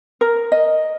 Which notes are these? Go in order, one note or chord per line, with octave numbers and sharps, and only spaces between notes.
A#4
D#5